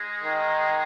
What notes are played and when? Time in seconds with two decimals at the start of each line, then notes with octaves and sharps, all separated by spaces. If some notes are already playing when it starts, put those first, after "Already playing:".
Already playing: G#3 D#4 G#4
0.24 D#3